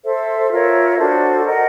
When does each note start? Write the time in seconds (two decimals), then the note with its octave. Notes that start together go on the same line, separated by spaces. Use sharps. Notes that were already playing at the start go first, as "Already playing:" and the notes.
0.03 A4 C5 E5
0.51 F4 A#4 C#5 E5
0.98 D4 F#4 A4 C5
1.45 A#4 D#5 F#5